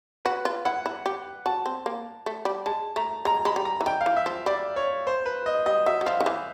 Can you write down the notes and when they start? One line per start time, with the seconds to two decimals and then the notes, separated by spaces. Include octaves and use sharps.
0.25 F#4 B4
0.45 F4
0.65 E4 F#5
0.86 E4
1.06 G4
1.46 F#4 A5
1.66 C4
1.86 A#3
2.26 A3
2.45 G3
2.66 G#3 A5
2.96 A3 A#5
3.25 G#3 A#5
3.45 G#3 B5
3.56 G3
3.65 A#5
3.81 E3
3.86 D#3 G5
4.01 F5
4.06 E3
4.16 E5
4.26 F3
4.46 G3 D5
4.76 C#5
5.07 C5
5.26 B4
5.46 D#5
5.66 G3 D#5
5.86 F#3 E5
6.01 F#3
6.06 F3 F5
6.20 D#3
6.26 E3